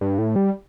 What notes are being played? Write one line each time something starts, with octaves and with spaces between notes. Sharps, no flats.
G2
A2
G3